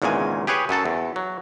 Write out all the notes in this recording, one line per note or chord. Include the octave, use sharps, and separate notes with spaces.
G#1 E2 A#2 C#3 G#3 G#5
G4 G#4 B4 C#5
F#2 F#3 A4 A5
E2
F#3